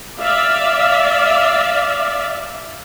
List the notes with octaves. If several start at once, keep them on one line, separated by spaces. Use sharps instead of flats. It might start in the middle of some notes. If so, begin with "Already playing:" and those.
D5 E5 F5